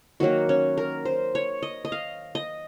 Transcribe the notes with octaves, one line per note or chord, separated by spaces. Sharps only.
D#3 F#3 A#3 F#4
C#4
A#4
C5
C#5
D#5
D#5
F5
D#5